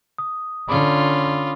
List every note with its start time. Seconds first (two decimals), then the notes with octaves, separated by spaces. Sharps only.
0.18 D#6
0.69 D3 C#4 F4 B5 D6